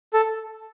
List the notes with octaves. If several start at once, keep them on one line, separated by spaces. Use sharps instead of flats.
A4